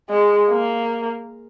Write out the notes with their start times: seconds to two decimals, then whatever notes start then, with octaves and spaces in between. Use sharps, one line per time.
0.10 G#3
0.49 A#3